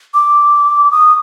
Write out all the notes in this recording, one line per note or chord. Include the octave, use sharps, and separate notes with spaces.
D6
D#6